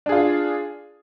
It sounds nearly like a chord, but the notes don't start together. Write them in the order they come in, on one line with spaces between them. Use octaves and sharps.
D4 G#4 F4